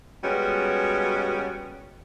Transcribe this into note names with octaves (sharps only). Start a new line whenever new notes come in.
G3 G#3 B3 C#4 F#4